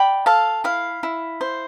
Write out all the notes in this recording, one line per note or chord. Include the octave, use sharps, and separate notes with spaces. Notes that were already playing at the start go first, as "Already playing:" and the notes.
Already playing: D5 G5 B5
A4 F5 A5
E4 F5
E4
C5